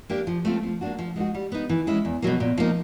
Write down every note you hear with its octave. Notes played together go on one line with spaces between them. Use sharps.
A#3 D4 G4
F3
A3 C4 F4 A4
F3
A#3 D4 F#4
F3
G#3 B3 D#4 F#4
G3
B3 D#4
E3
G#3 C#4 E4
E2
B2 F#3 A#3
A#2
F3 A#3 D#4